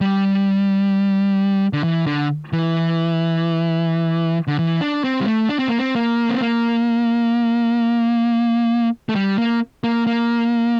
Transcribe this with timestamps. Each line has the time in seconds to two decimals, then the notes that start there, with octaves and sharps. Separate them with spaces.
0.01 G3
1.73 D3
1.84 E3
2.06 D3
2.53 E3
4.48 D3
4.59 E3
4.81 D4
5.04 C4
5.21 G3
5.27 A3
5.49 D4
5.59 C4
5.68 A#3
5.78 C4
5.95 A#3
6.29 C4
6.41 A#3
9.09 A3
9.16 G3
9.38 A#3
9.84 A#3
10.07 A#3